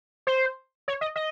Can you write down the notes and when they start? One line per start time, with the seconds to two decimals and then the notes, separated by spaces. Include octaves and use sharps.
0.27 C5
0.88 C#5
1.01 D#5
1.16 D#5